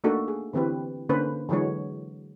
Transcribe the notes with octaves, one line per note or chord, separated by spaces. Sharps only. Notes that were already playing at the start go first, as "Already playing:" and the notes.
A3 A#3 D4 D#4 F#4 A4
G#4
D3 E3 C4 G4 B4
D3 A#3 C#4 D#4 B4 C5
D3 E3 F#3 G#3 F#4 C#5